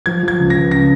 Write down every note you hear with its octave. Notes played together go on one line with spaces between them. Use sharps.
F3 G#6
F3 G#6
C#2
C#2 A#6
C#3 A#6